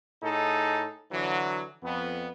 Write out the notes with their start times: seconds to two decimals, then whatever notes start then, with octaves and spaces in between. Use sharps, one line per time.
0.22 A2 D#4 G#4 A4
1.11 D3 E3 F#3
1.82 F2 B3